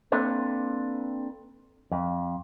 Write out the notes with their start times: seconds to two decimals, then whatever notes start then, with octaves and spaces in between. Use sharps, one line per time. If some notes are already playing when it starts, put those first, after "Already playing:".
0.12 A#3 C4 D4 A4 B4
1.92 F2